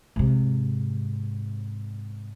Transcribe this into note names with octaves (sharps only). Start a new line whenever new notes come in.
G#2 C3